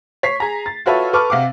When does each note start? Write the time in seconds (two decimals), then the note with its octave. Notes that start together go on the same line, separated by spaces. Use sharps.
0.23 C#5 B6 C7
0.40 G#4 A#5
0.66 A6
0.86 F4 F#4 A4 B4 C#5 E5
1.13 A4 B4 C#6 D6 F6
1.30 C3 F5 F#5 D6